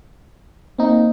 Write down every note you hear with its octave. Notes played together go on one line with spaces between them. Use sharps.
A#3 C4 D#4